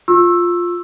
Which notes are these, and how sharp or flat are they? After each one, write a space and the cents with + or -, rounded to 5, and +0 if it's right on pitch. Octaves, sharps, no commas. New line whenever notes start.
F4 +5 C#6 -40 E6 +0